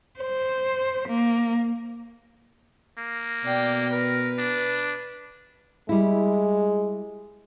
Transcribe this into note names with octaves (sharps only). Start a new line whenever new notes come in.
C5
A#3
A#3
B2 D5 G5
A#4 B4
D4
G3 G#3 E4